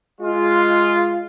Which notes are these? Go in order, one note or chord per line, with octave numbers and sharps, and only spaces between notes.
G#3 F4